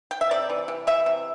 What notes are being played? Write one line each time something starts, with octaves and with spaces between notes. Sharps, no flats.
G5
E5
C3 D5
E3
C3
E3 E5
C3